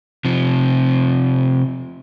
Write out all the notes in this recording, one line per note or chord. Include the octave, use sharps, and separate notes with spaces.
C3 F3